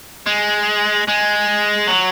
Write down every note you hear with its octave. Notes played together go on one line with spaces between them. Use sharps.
G#3
G#3
F#3